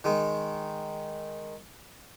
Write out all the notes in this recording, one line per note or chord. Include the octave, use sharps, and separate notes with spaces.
D#3 G#3